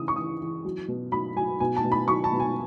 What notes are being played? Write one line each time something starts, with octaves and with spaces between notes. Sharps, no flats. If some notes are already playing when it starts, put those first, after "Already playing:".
Already playing: C#3 E3 D#6
C#6
E3 D#6
E3
F#3
B2
F#3 B5
F#3 G#5
B2 G#5
A5
B2
B5
F#3 C#6
A5
B2
G#5